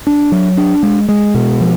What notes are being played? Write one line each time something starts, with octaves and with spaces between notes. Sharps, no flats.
D4
F#3
D4
G#3
G#3
B2
F3